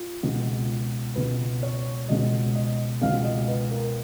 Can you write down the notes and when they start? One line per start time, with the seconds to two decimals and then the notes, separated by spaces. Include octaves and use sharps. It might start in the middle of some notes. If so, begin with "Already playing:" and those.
Already playing: F4
0.23 C#2 B2 G#3 B3
1.16 C#2 B2 G#3 B3 B4
1.63 C#5
2.08 C#2 B2 G#3 B3 D#5
2.55 D#5
3.01 C#2 B2 G#3 B3 F5
3.24 D#5
3.48 B4
3.71 A#4